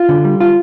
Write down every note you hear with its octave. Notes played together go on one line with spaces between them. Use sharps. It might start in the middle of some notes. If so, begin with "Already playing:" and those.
Already playing: F4
D3
G3
F4